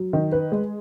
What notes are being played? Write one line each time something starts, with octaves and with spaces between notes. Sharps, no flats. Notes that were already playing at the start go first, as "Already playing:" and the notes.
Already playing: F#3
D#3
B4
G#3